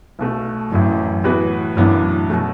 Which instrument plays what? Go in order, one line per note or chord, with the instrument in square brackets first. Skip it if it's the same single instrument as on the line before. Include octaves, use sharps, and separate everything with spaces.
[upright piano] B1 B2 A3
[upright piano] A1 A2 E3 [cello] F#2
[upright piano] A2 E3 B3 F#4 B4
[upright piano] B1 A2 E3 B3 D4 [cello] F#2
[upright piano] B2 F#3 A3